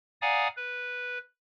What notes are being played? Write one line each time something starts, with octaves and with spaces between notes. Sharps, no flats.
D5 F5 F#5 G#5 A#5 D#6
B4